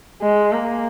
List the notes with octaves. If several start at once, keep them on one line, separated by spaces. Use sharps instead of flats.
G#3
A#3